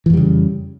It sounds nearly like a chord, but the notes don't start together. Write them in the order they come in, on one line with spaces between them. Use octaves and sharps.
E3 F2 G3 C#3